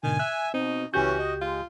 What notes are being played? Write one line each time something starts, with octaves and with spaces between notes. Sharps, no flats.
G#2 B2 D3 D#3 G#5
E5 F#6
B2 C4 D#4
C#2 E3 C#4 F#4 G4 G6
D#5
G#3 F4